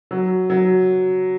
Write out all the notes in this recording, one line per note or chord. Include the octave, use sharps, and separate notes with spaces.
F#3
F#3